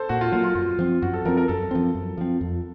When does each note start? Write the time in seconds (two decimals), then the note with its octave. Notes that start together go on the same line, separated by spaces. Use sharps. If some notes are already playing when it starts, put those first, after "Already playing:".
Already playing: A4 C5
0.09 A#2 F#4
0.21 F4
0.32 F#3 A#3 F4
0.44 F4
0.55 F#2 F4
0.79 F3 C4
1.02 F#2 F#4
1.13 A4
1.25 F3 A#4
1.28 C4
1.37 A#4
1.48 F#2 A4
1.71 F3 C4
1.95 F#2
2.18 F3 C4
2.41 F2